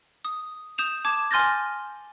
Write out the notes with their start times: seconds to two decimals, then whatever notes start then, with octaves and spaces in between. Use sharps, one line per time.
0.25 D#6
0.78 D#6 G6 E7 F7
1.05 A5 D6 G#6 E7
1.31 G#5 C6 F6 G6 A6 A#6